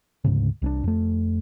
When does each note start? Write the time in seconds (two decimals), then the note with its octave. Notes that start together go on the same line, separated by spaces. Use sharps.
0.24 D2 G#2 C#3
0.62 C2 C#4 D4
0.84 F2 A3